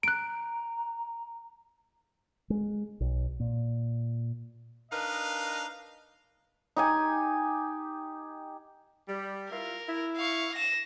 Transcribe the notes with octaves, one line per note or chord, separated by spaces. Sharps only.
A#5 F#6 D7
G#3
B1
A#2
D4 D#4 A#4 B4 D#5 F5
D#4 G4 G#5
G3
E4 F4 A#4
E4
F5 C#6
A#6 E7